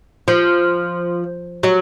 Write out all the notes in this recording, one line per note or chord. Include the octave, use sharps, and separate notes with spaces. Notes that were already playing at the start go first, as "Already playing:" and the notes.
F3
F#3